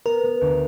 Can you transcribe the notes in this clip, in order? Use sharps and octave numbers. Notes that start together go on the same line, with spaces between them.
B3 A#4
B3
D2